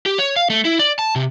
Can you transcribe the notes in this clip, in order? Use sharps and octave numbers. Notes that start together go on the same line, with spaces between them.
G4
C#5
F5
A3
E4
D5
A5
C3